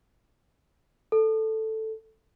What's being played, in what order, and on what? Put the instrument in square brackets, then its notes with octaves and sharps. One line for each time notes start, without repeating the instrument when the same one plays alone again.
[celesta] A4